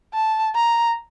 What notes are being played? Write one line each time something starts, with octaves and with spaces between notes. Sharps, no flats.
A5
A#5